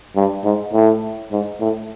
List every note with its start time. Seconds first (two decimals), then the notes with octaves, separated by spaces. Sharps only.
0.16 G2
0.44 G#2
0.73 A2
1.31 G#2
1.61 A2